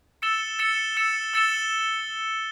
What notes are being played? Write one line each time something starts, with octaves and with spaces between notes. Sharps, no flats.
E6 A6 C#7 E7 G7
E6 A6 C#7 E7 G7
E6 A6 C#7 E7 G7
E6 A6 C#7 E7 G7